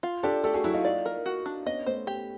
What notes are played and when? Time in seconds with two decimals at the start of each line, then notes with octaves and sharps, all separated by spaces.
0.03 F4
0.23 D4 G4 A4
0.44 A3 G4 A4
0.54 F#4 G#4
0.64 F#3 E4 F#4
0.74 D#4 F4
0.85 D5
1.06 A#4
1.26 F#4
1.46 D4
1.66 B3 C#4 D#5
1.86 A3 B3 C5
2.07 G4